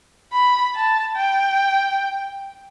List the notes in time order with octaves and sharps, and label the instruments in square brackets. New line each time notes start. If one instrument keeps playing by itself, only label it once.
[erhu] B5
A5
G5